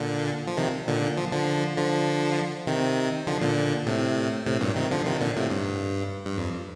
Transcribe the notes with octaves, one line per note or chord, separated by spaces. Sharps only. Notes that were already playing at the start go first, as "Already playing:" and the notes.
Already playing: A#2 D3
F3
C3 D#3
A#2 D3
F3
D3 F3
D3 F3
C3 D#3
D3 F3
A#2 D3
A2 C3
A2 C3
G2 A#2
C3 D#3
D3 F3
C3 D#3
A#2 D3
A2 C3
G2
G2
F2